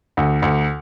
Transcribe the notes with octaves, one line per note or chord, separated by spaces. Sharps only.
D2
D2